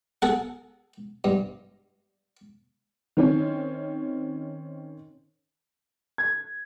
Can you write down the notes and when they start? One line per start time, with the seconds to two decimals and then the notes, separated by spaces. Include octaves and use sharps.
0.22 G#4 A4 F#5
1.24 G2
3.17 D#3 C4 C#4
6.18 G#6